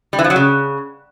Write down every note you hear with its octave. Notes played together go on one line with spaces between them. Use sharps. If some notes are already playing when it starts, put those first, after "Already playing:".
G3
E3
F3
F#3
C#3